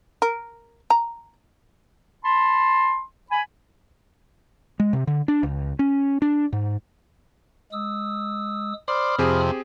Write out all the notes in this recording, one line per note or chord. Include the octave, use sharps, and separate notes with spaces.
A#4
A#5
A5 B5 C6
G#5 B5
G#3
C3
D3
D4
C#2
C#4
D4
G#2
G#3 D#6 E6
C5 D5 B5 D#6 F6
F2 C3 C4 G4 G#4